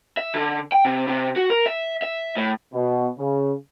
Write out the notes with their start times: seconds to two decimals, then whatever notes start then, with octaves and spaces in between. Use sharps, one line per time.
0.17 E5
0.34 D3
0.72 G5
0.85 C3
1.08 C3
1.36 F#4
1.50 A#4
1.66 E5
2.02 E5
2.37 A2
2.74 B2
3.18 C#3